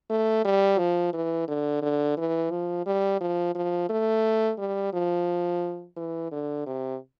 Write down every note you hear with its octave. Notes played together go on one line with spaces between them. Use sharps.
A3
G3
F3
E3
D3
D3
E3
F3
G3
F3
F3
A3
G3
F3
E3
D3
C3